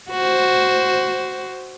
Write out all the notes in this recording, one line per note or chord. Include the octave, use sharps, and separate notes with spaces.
F#4 C5